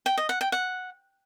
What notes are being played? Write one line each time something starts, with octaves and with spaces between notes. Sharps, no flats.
G5
D#5
F#5
G5
F#5